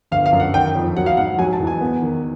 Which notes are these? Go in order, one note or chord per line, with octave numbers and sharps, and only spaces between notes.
G1 F5
F5
F#2
F#5
D#3 G5
F2
F#3 F#5
F5
G#2 F#5
F#3 G#5
A5
E2
G#5
B3
D#3